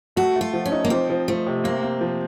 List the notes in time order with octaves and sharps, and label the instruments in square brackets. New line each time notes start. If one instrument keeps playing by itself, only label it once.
[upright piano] A3 [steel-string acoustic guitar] F#4
[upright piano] A3 [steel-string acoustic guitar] F4
[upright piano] F3
[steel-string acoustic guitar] C#4
[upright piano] D#4
[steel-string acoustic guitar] A#3
[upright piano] F3 [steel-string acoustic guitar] C4
[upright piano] F3
[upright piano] F3 [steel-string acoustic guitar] A3
[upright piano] C3
[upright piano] A#3 [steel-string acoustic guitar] C4
[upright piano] A#3
F3